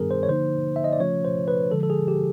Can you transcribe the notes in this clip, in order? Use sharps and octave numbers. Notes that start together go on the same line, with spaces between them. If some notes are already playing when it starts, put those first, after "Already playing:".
Already playing: G2 D#3 G3 B3 D4 G#4 A#4
C5
C#5
D3 F3 A#3 D#4 C5
E5
D#5
D5
C#3 F3 A3 C#4 F4 C#5
C5
B4
D3 F3 G#3 A4
A4
G#4
G4